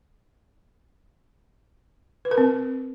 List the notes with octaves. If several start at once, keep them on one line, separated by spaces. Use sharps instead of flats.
B4
A#4
C4